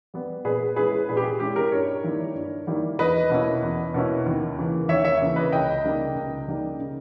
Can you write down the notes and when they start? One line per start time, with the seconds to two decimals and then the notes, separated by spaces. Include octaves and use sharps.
0.14 G3 B3
0.45 A#2 G#4 B4
0.76 G#3 C#4 E4 G#4 B4
1.09 A#2 G#4 B4
1.17 G4
1.24 G#4
1.40 G#3 C#4 E4 G4
1.56 G4 A#4
1.72 G2 A#4 C#5
2.04 D#3 G3 A#3 E4
2.35 G2
2.67 D#3 G3 A#3 E4
2.98 E2 B4 D#5
3.30 B2 A#3 C#4 E4
3.62 E2
3.94 B2 A#3 C#4 E4
4.26 D#2
4.57 C#3 E3 A#3
4.88 D#2 C#5 E5
5.05 C#5 E5
5.21 C#3 E3 A#3
5.36 B4 D#5
5.52 C#2 D#5 G5
5.84 C#3 G3 A#3 D#4
6.16 C#2
6.47 C#3 G3 A#3 D#4
6.79 C#3